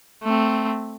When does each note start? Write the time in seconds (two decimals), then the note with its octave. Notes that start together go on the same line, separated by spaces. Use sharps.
0.24 A3 C4